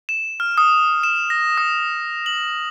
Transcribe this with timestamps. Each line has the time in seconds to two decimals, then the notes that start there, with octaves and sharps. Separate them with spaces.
0.09 E7
0.40 F6
0.58 D#6
1.03 E7
1.30 A#6
1.58 D#6
2.26 F#7